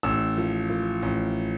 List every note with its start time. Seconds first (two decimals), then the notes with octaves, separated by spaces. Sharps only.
0.03 A1 E6
0.37 F3
0.70 F3
1.02 A1